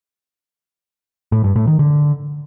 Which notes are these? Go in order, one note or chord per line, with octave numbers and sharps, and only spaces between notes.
A2
G2
A2
D#3
D3